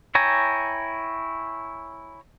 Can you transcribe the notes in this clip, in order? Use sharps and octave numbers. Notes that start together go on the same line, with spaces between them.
E4 C#5 G5 G#5 A#5